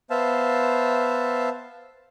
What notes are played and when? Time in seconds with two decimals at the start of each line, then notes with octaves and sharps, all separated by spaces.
0.10 B3 C5 E5 F5 A5